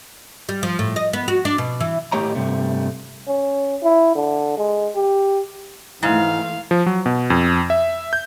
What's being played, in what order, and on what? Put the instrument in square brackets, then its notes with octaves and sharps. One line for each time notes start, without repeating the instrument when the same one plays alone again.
[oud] G3
F3
A2
D#5
B3
F#4
D4
B2
E3
[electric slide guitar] A2 A3 G4 C#5 D#5 A#5
G2 C3 A3
[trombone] C#4
E4
D3
G#3
G4
[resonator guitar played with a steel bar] G#2 [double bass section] E3 A3 [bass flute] E4 [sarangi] F5
[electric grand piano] F3
F#3
B2
F2
E5
G6